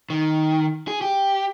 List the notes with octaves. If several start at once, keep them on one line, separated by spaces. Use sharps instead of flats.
D#3
G#4
G4